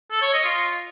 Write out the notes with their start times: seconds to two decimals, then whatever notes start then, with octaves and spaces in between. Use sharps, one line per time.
0.11 A4
0.22 C#5
0.33 D#5
0.45 F4